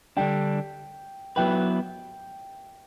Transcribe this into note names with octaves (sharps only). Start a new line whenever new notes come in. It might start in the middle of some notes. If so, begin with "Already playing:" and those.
D3 G3 D4 G5
F#3 B3 E4 B4 G5